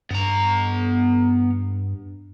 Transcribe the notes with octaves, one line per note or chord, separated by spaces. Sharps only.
G2 B3 A#5